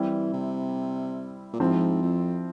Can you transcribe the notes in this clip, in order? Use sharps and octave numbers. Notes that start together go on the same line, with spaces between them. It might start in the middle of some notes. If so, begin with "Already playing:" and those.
Already playing: E3 G3 C4 E4
C3
A#2
G#2 F3 C4 E4
F2